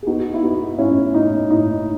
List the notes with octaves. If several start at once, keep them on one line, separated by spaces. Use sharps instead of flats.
G#4
B3 D#4 F#4
E4
B3 D#4 F#4
A2 C#4 E4
A2 D#4
A2 D#4